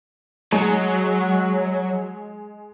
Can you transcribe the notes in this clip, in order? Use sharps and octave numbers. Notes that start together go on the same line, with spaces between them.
F#3 G#3